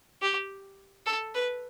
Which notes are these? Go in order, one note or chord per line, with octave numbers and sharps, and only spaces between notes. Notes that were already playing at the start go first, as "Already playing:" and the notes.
G4
A4
B4